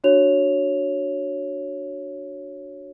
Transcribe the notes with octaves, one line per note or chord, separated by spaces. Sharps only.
D4 F#4 C#5 F7